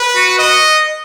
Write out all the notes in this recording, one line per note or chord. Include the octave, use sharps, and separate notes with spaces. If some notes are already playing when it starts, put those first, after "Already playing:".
Already playing: B4
F#4
D#5